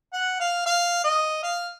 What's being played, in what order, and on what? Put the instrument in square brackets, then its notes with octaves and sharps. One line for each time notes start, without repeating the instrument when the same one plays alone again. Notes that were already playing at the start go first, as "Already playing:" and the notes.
[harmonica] F#5
F5
F5
D#5
F5